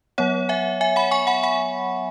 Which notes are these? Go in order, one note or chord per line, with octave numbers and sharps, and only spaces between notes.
F#3 B3 C#5 F#5
E5 G#5
E5 G#5
F#5 B5
G#5 C#6
F#5 B5
F#5 B5